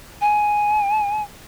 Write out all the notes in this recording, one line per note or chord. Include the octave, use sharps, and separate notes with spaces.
G#5